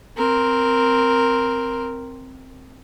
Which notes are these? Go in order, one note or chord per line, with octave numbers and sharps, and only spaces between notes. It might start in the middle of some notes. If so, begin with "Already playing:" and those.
C4 A#4